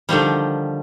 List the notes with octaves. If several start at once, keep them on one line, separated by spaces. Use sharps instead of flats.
D3 D#3 F3 G3